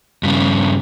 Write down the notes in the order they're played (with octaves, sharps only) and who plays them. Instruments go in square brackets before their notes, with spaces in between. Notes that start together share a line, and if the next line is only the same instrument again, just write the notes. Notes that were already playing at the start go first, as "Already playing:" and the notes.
[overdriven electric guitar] G2 C#3